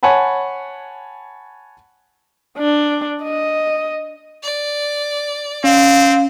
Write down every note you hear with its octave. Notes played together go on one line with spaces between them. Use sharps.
C#5 F#5 G#5 A5 B5
D4
D#5
D5
C4 C#4 F5